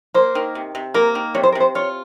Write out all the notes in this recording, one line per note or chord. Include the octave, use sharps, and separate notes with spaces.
A#3 C5
D#3
C3
C3
A#3 A#4
D#3
C3 C#5
C5
A#4
C3 C5
F4 C#5